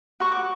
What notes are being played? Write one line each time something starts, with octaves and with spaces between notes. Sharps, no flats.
F#4 C#6
D6